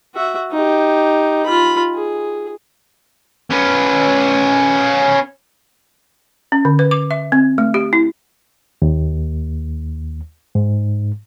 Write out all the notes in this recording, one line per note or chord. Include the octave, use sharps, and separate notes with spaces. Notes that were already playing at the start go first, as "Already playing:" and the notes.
F#4 E5
D#4 G4
F4 B5
G#4
C#4 B4
C#4
D3
B4
D6
E5
C4
A3
G4
E4
D#2
G#2